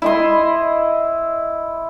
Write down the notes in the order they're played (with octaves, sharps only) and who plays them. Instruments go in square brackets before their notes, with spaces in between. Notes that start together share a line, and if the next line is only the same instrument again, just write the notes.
[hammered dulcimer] E4 D#5 C6